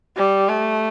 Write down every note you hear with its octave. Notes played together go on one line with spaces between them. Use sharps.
G3
A3